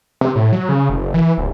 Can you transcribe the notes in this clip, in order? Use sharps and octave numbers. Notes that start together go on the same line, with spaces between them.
C3
A2
F#3
C#3
F#1
E3
D1